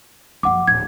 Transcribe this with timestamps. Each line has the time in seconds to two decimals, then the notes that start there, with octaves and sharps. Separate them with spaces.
0.43 F#1 F3 F#5 D6
0.68 D1 G#6